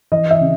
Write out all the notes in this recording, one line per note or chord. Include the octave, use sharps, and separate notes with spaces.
E3 D#5
E5
C#3